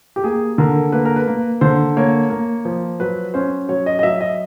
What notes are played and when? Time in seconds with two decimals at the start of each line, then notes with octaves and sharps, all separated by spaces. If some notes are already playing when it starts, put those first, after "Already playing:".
0.16 G4
0.24 A#3 G#4
0.58 D3 A#4
0.92 A#3 B4
1.05 A#4
1.16 B4
1.28 A#3
1.61 D3 C5
1.97 A#3 C#5
2.30 A#3
2.65 F3
3.00 F#3 B4
3.34 C#4 C5
3.69 F#3 C#5
3.86 D#5
3.99 D#5
4.03 F#3 E5
4.21 D#5